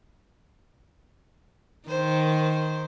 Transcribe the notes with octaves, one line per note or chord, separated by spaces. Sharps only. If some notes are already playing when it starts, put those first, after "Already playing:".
D#3 C5